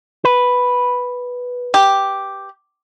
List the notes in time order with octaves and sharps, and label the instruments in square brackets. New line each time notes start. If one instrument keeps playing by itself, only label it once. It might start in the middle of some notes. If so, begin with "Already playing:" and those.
[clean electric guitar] B4
[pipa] G4